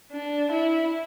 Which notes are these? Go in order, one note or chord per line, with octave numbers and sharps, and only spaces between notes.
D4
E4